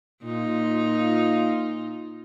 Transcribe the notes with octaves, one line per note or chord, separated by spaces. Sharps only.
A#2 D#4 F4